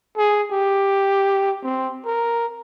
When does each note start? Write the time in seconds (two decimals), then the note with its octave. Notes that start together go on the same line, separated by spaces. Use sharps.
0.17 G#4
0.51 G4
1.63 C4
2.06 A#4